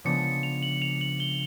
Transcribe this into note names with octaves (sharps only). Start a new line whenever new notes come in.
C#3 F3 G#3 B3 D4 C#7
C#7
F7
F#7
F7
F#7
G7